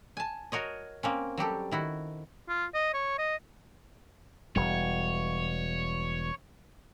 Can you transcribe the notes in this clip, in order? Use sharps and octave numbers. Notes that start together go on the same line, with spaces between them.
G#5 A5
F#4 A#4 C#5 D#5
A#3 C4 C#4
F#3 G3 G4 A4
D#3 E4 F#4
F4
D#5
C#5
D#5
E1 G3 C#5